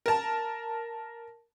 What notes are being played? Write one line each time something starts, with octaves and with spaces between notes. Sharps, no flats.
A#4 A5